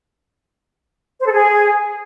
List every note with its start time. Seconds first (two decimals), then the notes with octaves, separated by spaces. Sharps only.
1.20 C5
1.26 A4
1.32 G#4